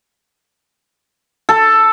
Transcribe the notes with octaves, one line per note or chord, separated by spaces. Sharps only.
A4